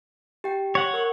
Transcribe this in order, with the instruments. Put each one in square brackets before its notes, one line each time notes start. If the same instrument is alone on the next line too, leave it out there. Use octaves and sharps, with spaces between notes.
[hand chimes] G4 G5
[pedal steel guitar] C#5 F#5
[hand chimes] A#4 C#6 C#7